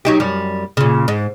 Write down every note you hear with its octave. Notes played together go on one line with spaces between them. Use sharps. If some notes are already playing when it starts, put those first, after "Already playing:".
F#3 D#4 G4
F#2 G3
A#2 C#3
G#2